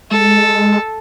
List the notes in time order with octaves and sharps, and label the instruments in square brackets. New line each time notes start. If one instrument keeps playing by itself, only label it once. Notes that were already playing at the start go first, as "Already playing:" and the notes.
[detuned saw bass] G#3 [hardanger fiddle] A4